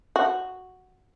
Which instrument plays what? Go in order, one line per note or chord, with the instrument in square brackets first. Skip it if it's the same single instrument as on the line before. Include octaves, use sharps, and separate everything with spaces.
[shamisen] F#4